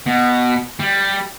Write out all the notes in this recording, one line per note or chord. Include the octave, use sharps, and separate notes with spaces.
B2
G3